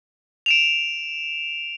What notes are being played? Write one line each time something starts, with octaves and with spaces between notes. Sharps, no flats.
D7 E7 F7